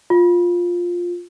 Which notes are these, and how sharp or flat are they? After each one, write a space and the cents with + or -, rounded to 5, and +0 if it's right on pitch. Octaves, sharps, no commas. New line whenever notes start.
F4 +10